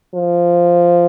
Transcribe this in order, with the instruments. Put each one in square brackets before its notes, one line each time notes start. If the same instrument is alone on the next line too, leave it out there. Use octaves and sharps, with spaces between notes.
[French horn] F3